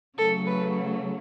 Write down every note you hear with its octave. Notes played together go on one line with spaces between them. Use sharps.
C#3 F#3 A3 A4
B4